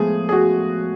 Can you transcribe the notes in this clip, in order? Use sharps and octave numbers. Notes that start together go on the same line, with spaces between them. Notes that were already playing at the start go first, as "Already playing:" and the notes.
Already playing: A2 F3 G#3 B3 G#4
G#4
F#4